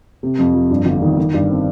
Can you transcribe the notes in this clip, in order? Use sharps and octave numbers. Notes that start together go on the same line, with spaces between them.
C3
F2
F3
G2
G1
D#3
D#3
G2
C4